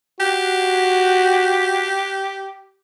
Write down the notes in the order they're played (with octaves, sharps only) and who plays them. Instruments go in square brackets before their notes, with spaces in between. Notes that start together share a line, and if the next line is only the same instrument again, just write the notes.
[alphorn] F#4 [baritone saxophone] G4